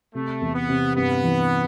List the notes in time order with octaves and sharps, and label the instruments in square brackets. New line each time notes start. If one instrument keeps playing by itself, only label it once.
[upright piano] C3 [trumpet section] A3
[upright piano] E2
[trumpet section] B3
[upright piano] C3
[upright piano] G2 [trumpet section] B3
[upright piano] E3